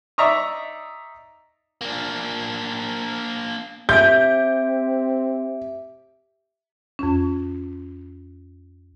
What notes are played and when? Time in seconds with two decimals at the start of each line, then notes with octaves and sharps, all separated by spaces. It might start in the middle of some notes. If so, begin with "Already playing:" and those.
0.18 D#4 D5 E5 A#5 C#6 D#6
1.81 A#3 D4
3.89 C4 G4 E5 G6 D7
6.99 F2 C#4